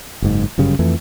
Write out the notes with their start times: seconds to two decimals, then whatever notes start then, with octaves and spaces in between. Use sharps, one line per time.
0.22 F#1 G#2
0.58 G1 F#2 C#3 G3
0.79 F2 E3 A3